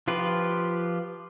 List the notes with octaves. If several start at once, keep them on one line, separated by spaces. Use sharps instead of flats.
F3 F4 G4 B4